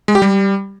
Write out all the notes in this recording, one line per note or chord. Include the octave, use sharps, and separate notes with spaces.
G#3
G4
G3